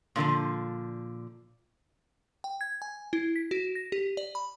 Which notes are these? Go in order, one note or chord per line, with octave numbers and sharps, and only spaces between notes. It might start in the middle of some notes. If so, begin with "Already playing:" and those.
A#2 D3 E3 F3
G5
G#6
G#5
E4
B6
F#4
A#6
G4
D5
B5